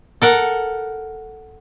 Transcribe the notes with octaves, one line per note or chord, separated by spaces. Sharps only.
A4 A#4 F#5